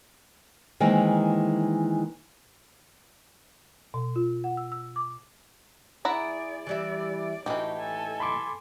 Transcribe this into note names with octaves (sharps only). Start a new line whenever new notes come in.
D#3 E3 G#3 A#3 C4
B2
F4
F#5
E6
E6
D6
E4 G#4 D5 F#5 A#5
E3 G3 D5 E5
A2 E3 D#4 F#4 G4
A4 G#5
B5 C6 D6